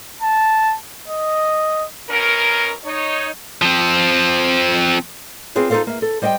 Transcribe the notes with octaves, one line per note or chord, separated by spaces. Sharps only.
A5
D#5
B2 C#4 A#4
D#4 C#5
F3 C4
C4 E4 F4 G#4 B4 C#5
D#4 F4 G#4 A4 C5 F5
A#3 E5
A4
G3 C5 D#5 E5 G5